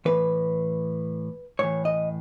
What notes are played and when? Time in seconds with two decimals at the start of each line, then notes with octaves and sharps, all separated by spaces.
0.05 A2 E3 B4
1.59 A2 E3 C#5
1.85 D#5